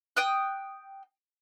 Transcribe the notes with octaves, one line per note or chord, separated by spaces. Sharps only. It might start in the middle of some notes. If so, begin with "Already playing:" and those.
G5 D#6 F#6